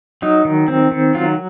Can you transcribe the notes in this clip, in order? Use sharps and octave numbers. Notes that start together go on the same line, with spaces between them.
F#3 D#4
D#3
C4
D#3
F#3 F4